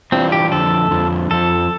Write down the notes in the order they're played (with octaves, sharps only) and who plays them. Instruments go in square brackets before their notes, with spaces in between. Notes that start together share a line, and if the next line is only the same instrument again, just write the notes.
[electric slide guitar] E3 G3 D4 F4 [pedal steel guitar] C4
[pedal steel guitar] G4
[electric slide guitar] F2 D3 F3 [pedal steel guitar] A4
[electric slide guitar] F2 D3 F3
[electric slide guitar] F2 D3 F3 [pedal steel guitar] A4